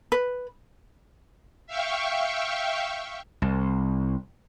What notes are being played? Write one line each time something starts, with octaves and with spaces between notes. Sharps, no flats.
B4
E5 F5 G5 C#6
C2